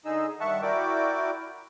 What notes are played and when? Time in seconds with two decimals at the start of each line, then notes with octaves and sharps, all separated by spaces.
0.05 D3 D#4 G#4 D#5 E6
0.40 G2 D#3 E5 F#5 A5 C#6
0.62 E4 F#4 A#4 D5 G5 D6